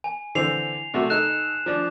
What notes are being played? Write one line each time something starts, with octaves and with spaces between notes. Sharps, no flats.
G#5
D3 E3 C4 C7 F7
C3 A3 F#4
D#4 A4 D#5 F#6 E7
F3 D4